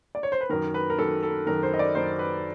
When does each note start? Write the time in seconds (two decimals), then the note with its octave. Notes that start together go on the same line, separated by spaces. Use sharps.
0.15 D5
0.23 C#5
0.32 C5
0.41 B4
0.49 F#2 D#3 A#4
0.74 B4
0.90 A#4
0.98 F#2 D#3 A4
1.23 A4
1.46 F#2 D#3 A#4
1.63 C5
1.74 D#5
1.79 D5
1.95 F#2 D#3 C5
2.19 B4